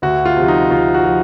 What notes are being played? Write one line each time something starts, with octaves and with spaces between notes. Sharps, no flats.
D2 F#4
F4
C3 F3
D#4
D2 F4
F#4
F3